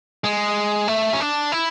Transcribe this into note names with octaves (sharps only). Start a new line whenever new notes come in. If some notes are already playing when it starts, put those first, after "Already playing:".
G#3
A3
C#4
D4
E4